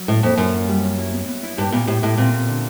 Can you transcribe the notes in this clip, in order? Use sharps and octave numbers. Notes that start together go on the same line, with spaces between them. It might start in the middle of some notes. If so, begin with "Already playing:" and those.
Already playing: F#3
A2 C#4
F2 A#3
F#2 F4
F4
G3
C#4
E4
B3
B3
E4
G2 G4
A#2 B3
A2 G4
A2 E4
A#2 C4
C4
D3